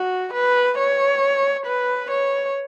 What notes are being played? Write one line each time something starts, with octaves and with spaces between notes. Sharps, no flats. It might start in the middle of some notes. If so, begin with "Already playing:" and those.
Already playing: F#4
B4
C#5
B4
C#5